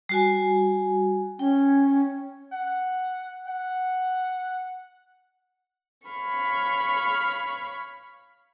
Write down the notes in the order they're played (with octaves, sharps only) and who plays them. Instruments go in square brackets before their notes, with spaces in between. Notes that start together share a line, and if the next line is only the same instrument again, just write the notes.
[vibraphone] G3 F#4 G#5
[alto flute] C#4 [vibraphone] G5
[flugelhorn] F#5
F#5
[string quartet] C#5 F5 B5 C#6